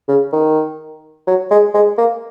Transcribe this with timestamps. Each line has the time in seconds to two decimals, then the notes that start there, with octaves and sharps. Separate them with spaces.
0.08 C#3
0.33 D#3
1.27 F#3
1.51 G#3
1.74 G#3
1.98 A#3